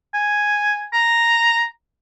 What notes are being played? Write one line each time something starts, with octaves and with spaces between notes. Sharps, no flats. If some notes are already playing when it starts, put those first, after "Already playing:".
G#5
A#5